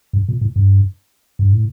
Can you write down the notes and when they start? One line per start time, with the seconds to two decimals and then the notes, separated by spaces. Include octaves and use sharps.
0.13 G2
0.29 A#2
0.41 A2
0.56 G2
1.39 G2
1.53 A2